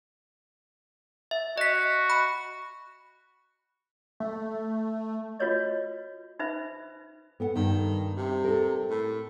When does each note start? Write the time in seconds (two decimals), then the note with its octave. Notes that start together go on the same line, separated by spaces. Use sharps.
1.31 E5
1.58 F#4 D#5 B6
2.10 B5
4.20 A3
5.39 F4 F#4 B4 C#5 D#5
6.39 D#4 B4 C5 E5 B5
7.40 B3 A4 F#5
7.55 G2 D#3
8.17 C3
8.44 A4 A#4
8.90 A2